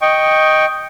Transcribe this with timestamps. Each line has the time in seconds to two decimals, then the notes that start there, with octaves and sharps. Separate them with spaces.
0.02 D#5 G5 C#6